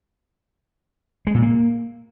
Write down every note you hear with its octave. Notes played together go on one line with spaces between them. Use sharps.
G#3
A#2
A#3